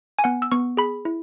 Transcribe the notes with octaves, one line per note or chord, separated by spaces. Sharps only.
G#5
B3 F#5
E6
B3 C#6
G#4 B5
E4